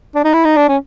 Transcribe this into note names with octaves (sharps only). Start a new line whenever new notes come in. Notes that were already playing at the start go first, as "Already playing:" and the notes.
D4
D#4
E4
D#4
D4
C#4